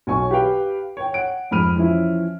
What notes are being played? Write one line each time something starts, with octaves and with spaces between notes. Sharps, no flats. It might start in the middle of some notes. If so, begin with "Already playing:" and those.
B1 C#5 G#5 C#6
G4 B4 F5 G5
C#5 G5
F#5 D7
F2 G#2 B5 F6 D#7
E3 F3 C#4 E4